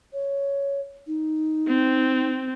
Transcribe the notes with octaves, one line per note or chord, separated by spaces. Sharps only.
C#5
D#4
C4